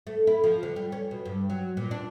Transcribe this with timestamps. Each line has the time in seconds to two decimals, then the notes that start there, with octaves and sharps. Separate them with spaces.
0.07 A3
0.27 E4
0.44 F3
0.63 D3
0.76 G3
0.92 C#4
1.11 B2
1.26 G2
1.50 F#3
1.77 A#2
1.91 D4